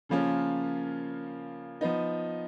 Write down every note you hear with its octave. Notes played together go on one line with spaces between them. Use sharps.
C#3 F3 A#3 C#4 F4
F3 B3 D#4